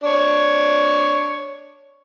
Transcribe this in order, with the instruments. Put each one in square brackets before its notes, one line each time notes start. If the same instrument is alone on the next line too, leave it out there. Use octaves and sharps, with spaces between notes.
[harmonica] D4 C#5